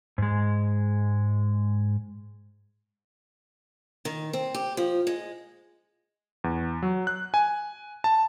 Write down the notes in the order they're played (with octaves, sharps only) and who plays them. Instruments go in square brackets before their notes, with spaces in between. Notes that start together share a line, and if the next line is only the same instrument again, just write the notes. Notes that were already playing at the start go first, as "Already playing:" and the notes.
[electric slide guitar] G#2 G#3
[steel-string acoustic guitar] D#3
C4
G4
F3
G#3
[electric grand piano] E2
F#3
F#6
G#5
A5